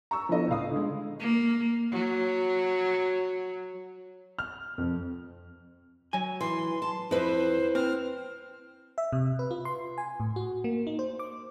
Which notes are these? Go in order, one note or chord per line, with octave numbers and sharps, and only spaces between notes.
A#5 C#6 E6
F3 B3 D4 E4 A4 D#5
C#2 A2 F5 D#6
D3 G#3
A#3
F#3
F6
F2
F#3 G#5
E3 C6
A5
F2 E4 B4 C5
C4 F6
E5
C3
B4
F4
C6
G#5
A2
F#4
A#3
D#4
C5
D6